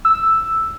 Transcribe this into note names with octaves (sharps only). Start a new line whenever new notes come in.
E6